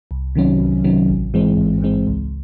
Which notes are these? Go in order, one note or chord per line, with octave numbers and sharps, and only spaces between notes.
C2
C3 D#3 F#3 C#4
C2
C3 D#3 F#3 C#4
A1
G#2 E3 G#3 C4
A1
G#2 E3 G#3 C4
C#2